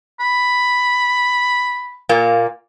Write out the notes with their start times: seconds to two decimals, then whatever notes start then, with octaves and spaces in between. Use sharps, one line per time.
0.20 B5
2.09 A#2 A#3